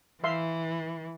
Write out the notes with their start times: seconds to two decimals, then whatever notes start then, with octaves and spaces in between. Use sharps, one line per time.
0.24 E3 E5 F5 C6